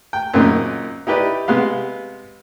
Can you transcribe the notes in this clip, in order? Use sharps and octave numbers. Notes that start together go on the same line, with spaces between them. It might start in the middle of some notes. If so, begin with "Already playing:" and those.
G5
F#2 A#2 C#3 C4 D#4
D#4 E4 G4 B4 D5
C3 G#3 B3 F5